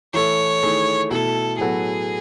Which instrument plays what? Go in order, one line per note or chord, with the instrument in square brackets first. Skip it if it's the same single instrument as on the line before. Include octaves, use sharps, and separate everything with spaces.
[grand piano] E3 A3 E4 A4 [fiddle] C#5
[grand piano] D#3 A3 E4 G#4
[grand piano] B2 A3 E4 [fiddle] A4
[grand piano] A2 F#3 B3 F#4 A4 [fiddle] G#4